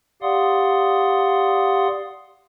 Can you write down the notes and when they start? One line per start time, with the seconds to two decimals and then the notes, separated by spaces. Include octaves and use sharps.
0.22 G4 D5 F5 F#5 C6 D#6